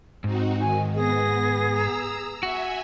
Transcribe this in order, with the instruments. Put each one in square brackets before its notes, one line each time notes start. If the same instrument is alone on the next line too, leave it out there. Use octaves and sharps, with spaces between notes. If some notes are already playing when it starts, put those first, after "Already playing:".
[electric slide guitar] G#2 [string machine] C4 D#4 F#4
[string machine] D#3 [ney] G#5
[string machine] B3 A#6 [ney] G#4
[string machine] A#5 E6
[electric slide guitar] F#4 [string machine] E5 G#5